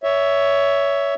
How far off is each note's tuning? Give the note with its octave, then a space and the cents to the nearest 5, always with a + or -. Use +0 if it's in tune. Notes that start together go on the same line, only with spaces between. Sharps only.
C#5 +15 E5 +0